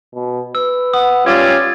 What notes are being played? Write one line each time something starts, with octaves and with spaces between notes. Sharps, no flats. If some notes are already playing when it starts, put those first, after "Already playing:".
B2
B4 E6
F#5 D#6
G3 C#4 F4 D5 G#6 A6